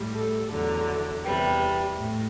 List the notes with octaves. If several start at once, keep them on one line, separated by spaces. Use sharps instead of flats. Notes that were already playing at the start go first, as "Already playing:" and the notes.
Already playing: A2 G3
A4
E2 D3 F#3
E2 C3 G3 B4
A2